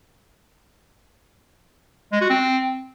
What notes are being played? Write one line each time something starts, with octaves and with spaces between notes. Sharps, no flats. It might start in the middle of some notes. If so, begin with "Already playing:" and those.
G#3
F#4
C4